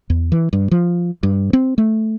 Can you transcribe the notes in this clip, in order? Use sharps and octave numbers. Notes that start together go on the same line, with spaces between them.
E2
E3
G2
F3
G2
C4
A3